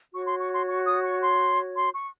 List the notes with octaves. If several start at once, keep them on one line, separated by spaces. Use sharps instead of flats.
F#4 C#5 C#6
C6
C#6
C6
C#6
D#6
C#6
C6
C6
C#6